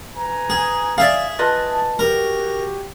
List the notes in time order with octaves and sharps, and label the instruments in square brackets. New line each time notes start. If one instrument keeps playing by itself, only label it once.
[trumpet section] B4 G#5 A#5
[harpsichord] G#4
[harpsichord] G#4 E5 [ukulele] D5 F5
[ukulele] F4 B4 D#5 [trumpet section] A5
[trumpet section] F#4 G4 [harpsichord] A#4